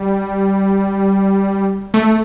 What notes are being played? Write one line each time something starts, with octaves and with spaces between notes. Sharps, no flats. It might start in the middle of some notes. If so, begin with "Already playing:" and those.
Already playing: G3
A3